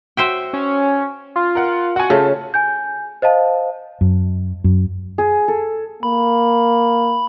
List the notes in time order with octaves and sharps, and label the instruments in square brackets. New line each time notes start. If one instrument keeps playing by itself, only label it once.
[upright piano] F#4 [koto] C5 E5 G5
[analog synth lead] C#4
F4
[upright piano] A#4 F#5
[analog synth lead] F#4 [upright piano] F#5 G#5
[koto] C#3 [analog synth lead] A3 [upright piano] F4 A5
[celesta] G#5 G6
C5 D#5 F5 A5
[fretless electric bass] F#2
F#2
[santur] G#4
A4
[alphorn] A#3 [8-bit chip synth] B5